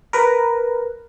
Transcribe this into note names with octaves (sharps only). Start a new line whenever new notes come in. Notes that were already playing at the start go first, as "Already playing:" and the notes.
A#4 B4